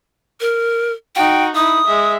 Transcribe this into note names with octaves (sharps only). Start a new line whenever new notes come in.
A#4
D#4 F#4 G5
D#4 E4 D#6
G#3 E5